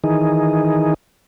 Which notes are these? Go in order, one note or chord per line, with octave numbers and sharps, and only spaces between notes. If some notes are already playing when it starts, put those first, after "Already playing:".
D#3 E3 D#4 G#4